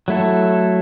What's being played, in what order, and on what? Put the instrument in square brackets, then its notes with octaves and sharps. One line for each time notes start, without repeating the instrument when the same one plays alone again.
[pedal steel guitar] F#3 A3 E4 A4